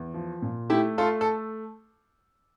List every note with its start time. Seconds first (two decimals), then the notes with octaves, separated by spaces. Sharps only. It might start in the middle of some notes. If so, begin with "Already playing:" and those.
Already playing: E2
0.14 F3
0.42 A#2
0.70 A3 E4 G4
0.98 A3 F4 A4
1.21 A4